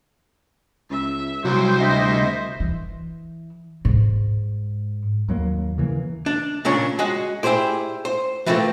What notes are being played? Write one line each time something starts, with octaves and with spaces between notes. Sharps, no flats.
C#2 E5
C2 F#3 C5
D2 D#5 E5
E3
G#2
D#2 F#3 A#3
C#3 E3 A#3
D4
A#2 C#3 D4 C#5
G#3 F#4 G#4
E4 G4 G#4 C5 D5
C5
E3 F3 A3 A#3 C4